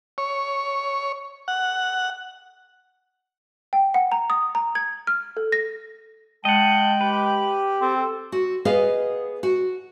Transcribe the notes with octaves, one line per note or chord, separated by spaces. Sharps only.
C#5
F#5
G5
F#5
A#5
D#6
A#5
G#6
F6
A4
A#6
G#3 D#5 F#5 G5 A5
G4 B4
C4 A4
F#4
B3 G#4 B4 D#5 F5
F#4